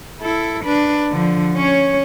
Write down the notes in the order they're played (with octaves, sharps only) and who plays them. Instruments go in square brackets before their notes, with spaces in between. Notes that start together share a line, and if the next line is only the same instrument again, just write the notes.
[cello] E4 A4
D4 B4
D3 F3
C#4 C#5